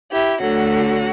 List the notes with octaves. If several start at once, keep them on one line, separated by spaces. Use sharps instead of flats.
E4 G4
D2 D3 F#3 F#4